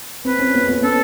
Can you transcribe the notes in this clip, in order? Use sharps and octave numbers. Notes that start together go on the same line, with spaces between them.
C4 B4
C#4
B3
B3
C#4 A4